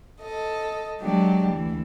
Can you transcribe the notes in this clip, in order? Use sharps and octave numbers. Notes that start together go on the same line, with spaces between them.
A4 D#5
F#3 G#3 B3 D4 G4
D2 E3